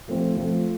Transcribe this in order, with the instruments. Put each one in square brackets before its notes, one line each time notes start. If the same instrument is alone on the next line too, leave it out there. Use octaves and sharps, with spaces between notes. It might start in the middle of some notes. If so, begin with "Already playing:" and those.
[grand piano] F3 A3 C4 F4
F3 A3 C4 F4